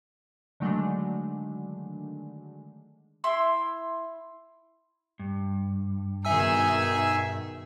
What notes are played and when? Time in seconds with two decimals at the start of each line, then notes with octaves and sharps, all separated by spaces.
0.60 D3 D#3 F#3 G#3 A3 D4
3.24 E4 C6 E6
5.19 G2
6.25 B2 D#3 D#4 G#4 E5 G#5 E6